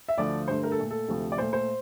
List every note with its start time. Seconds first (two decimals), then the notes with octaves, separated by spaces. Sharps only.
0.08 E5
0.17 D2 D3 F3 A3 D5
0.48 G2 D3 A3 C5
0.63 A#4
0.72 A4
0.78 A#2 A3
0.91 A4
1.08 D2 C3 F3 A3
1.32 D5
1.38 A#2 A3 C5
1.53 C5